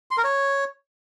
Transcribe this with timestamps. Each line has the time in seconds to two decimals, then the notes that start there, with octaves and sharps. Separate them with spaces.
0.11 C6
0.18 A#4
0.24 C#5